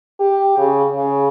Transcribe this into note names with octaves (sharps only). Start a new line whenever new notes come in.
G4
C#3
C#3